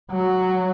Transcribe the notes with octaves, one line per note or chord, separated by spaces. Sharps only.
F#3